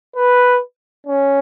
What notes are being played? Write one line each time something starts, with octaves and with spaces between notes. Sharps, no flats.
B4
C#4